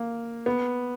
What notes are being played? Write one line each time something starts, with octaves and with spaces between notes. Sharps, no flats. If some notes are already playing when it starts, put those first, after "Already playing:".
Already playing: A#3
B3